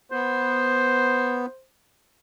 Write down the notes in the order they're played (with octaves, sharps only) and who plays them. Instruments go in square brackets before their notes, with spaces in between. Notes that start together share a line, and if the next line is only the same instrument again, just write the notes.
[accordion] B3 [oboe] C5